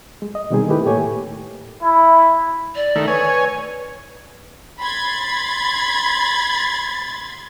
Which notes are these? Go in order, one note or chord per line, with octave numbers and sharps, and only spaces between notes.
G#3
D#5
B2 D#3 G3 C4 D#4 G#4
D#3 A3 E4 G4 B4
A2 A3 A#3 G4 C#5 G#5
E4
D5
D#3 A3
B4 C#5 G#5
B5 C6 G#6 A6